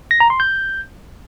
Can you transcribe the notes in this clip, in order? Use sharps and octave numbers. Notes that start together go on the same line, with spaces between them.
A#6
A#5
C6
G6